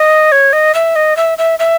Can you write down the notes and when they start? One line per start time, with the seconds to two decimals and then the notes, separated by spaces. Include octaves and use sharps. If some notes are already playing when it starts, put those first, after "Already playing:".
Already playing: D#5
0.32 C#5
0.53 D#5
0.75 E5
0.96 D#5
1.17 E5
1.38 E5
1.59 E5